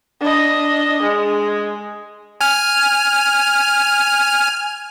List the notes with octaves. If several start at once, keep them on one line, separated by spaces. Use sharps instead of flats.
D4 D#5
G#3
G#5 F6